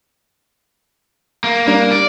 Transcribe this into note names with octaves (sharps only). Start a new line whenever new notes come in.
A#3
G3 A#3 D4
D5